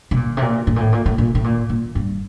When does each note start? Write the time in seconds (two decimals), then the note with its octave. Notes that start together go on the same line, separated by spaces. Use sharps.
0.11 C3
0.16 A#2
0.37 C3
0.42 A#2
0.67 A2
0.76 A#2
0.80 A2
0.93 A#2
1.06 A2
1.18 A#2
1.35 A2
1.44 A#2
1.69 A#2
1.95 G2